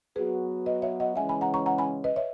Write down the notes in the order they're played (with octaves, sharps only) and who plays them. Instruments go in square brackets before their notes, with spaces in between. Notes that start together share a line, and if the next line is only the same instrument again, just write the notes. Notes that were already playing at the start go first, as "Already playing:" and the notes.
[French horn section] F#3 B3 F#4 [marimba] G#4 B4
[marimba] B4 D#5
C#5 E5
D#5 F#5
[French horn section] C#3 E3 G#3 C#4 [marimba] E5 G#5
[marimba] G#5 B5
F#5 A#5
A#5 C#6
F#5 A#5
G#5 B5
B4 D#5
C#5 E5